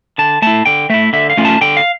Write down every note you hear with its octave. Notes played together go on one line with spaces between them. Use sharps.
D3 A5
A3 E4 A5
D3 G5
A3 E4 E5
D3 E5
F5
A3 C#4 F4
A5
D3 G5
F5